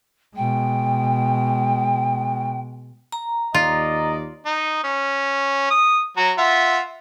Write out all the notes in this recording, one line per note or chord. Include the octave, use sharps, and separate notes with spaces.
B2 G#3 G5
A#5
D#2 F4 D5 D#5
D#4
C#4
D#6
F#3 F#4 A#5
F4 E5 F#5